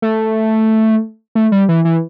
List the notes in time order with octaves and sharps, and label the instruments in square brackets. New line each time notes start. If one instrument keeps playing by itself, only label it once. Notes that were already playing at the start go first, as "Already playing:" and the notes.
[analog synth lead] A3
A3
G3
E3
E3